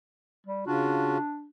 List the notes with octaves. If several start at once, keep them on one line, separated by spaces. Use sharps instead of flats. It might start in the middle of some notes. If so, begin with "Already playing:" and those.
G3
C#3 D4 F4 F#4